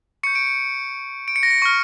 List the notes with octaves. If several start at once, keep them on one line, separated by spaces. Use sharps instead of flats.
C#6 G6 C#7
D7
C#7
D7
C#7
A#6
C#7
C#6 F6